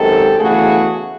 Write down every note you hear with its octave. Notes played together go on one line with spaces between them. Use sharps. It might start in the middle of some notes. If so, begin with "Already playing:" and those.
Already playing: F#2 D#3 G#3 C4 G4 A4
E2 C#3 E3 A3 F#4 G#4